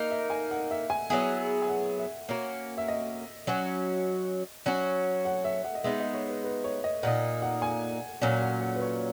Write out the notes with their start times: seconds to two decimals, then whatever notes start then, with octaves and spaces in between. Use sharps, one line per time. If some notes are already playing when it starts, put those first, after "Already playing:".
Already playing: A#3 D#4 A#4 D#5
0.11 E5
0.30 G#5
0.51 F#5
0.71 E5
0.90 G#5
1.10 F#3 B3 E4 G#4
1.62 G#5
1.68 F#5
1.99 E5
2.29 A#3 C#4 F#4 A#4
2.78 E5
2.88 D#5
3.47 F#3 C#4 F#4
4.66 F#3 C#4 F#4
5.25 F#5
5.45 E5
5.65 F#5
5.75 D#5
5.84 G#3 B3 D#4 E5
6.00 D#5
6.14 C#5
6.28 B4
6.44 B4
6.64 C#5
6.84 D#5
7.03 A#2 A#3 D#4 F#5
7.42 F#5
7.62 G#5
8.21 A#2 F#3 C#4 F#5
8.42 F#5
8.62 F#5
8.76 B4
8.82 C#5